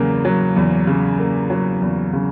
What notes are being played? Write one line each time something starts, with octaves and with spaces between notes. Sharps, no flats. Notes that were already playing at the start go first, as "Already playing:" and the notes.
Already playing: E2 C#3 F#3 A#3
F#3
E2
C#3
A#3
F#3
E2
C#3